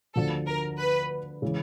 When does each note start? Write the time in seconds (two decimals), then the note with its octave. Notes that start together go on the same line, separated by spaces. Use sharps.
0.15 D2 D3 F3 A4
0.47 A#4
0.78 B4
1.42 C#3 E3 G#3